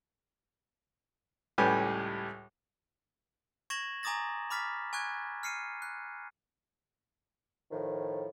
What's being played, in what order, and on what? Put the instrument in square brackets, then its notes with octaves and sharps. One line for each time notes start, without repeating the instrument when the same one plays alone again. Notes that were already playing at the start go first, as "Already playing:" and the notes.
[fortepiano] C#2 A2 G3 G4 B4 G#5
[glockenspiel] C#6 G#6 A#6 E7 F#7
G#5 A#5 D6 D#6 A6 A#6
B5 D6 F6 A6 B6
G#5 C#6 F#6 G#6
F6 C7 C#7 D#7
F#6
[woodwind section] A2 D#3 F3